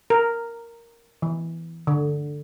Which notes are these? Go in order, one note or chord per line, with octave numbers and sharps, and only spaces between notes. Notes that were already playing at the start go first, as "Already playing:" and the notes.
A#4
E3
D3